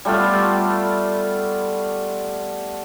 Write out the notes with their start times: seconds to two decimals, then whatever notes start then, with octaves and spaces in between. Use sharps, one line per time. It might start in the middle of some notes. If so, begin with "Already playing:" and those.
0.05 G3 A3 B3 F4